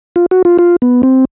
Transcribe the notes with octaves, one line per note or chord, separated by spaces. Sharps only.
F4
F#4
F4
F4
B3
C4